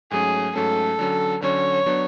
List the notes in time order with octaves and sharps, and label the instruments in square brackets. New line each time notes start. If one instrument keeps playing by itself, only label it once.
[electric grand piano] G#2 F#3 A3 C#4 [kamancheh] G#4
[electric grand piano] G#2 F#3 A3 C#4 [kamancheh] A4
[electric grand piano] D3 F#3 C#4
[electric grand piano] D3 F#3 C#4 [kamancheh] C#5
[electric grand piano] F#3 B3 D4